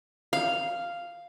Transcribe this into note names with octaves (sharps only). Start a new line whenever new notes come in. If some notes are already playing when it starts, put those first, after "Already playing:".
F5